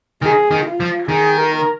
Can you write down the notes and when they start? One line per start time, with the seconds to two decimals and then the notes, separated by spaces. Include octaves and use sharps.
0.22 D#3 G#4
0.51 D#3
0.66 F4
0.80 F3
1.09 D#3 G#4
1.37 A#4